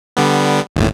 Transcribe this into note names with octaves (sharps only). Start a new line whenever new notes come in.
D3 G3 B3
G1 D#2 A2